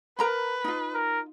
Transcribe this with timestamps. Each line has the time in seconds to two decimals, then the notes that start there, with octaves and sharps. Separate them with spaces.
0.19 A#4 B4 A#5 B5
0.64 D#4 F4
0.94 A#4